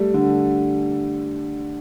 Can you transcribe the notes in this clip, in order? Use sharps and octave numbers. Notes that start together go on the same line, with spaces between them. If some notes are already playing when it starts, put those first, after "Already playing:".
Already playing: G3 A3
D3